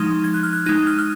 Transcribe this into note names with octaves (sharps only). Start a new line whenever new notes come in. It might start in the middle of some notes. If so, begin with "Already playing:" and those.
Already playing: F3 G#3 D#4 D#6
G#6
F#6
F6
F#6
G#3 D#4 F#6
F6
F6